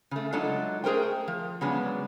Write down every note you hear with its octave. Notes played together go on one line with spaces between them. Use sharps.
C#3 A3
F#3 G#3 D4 D#4 F4 A4
A3 G#4 A#4 C5 G5
F3
C#3 F#3 G#3 B3 D4